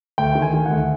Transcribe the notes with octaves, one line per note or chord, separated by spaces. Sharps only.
D2 G5
D#3
G#5
D#3
F#5
D2